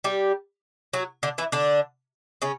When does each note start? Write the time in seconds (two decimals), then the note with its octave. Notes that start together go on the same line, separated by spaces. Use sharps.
0.04 G3 G4
0.93 F#3 F#4
1.23 D3 D4
1.38 E3 E4
1.52 D3 D4
2.42 C#3 C#4